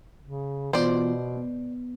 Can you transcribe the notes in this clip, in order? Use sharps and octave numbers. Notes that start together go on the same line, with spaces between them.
C#3
B2 E3 B3 F4 C5 D5
B3